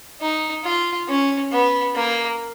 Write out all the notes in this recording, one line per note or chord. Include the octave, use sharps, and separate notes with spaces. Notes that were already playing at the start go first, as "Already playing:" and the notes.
D#4
F4
C#4
B3
A#3